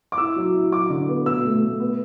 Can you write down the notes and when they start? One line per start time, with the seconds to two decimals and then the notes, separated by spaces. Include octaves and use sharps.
0.12 D6
0.18 E4 E6
0.36 F#3
0.54 E4
0.71 F#3 D6
0.90 D3
1.08 B3
1.26 B2 E6
1.45 A3
1.62 A3
1.80 B3